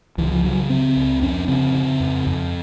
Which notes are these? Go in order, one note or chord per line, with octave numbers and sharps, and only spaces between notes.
C#2 E3
F3
C#3 F#3
C#3 C4
C#2
F2 C#4
C#3 C4
C#3
F2
F2